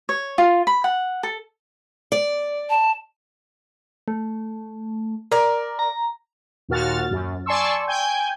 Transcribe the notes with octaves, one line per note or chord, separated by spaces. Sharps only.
C#5
F4
B5
F#5
A4
D5
A5
A3
A#4 D5
A#5
D#2 A#2 F#4 F6 A6
F#2
D5 G#5 A5 C6 C#6 E6
G5 G#5 G6